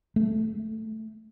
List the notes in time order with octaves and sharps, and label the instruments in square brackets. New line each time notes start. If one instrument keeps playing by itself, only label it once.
[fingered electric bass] A3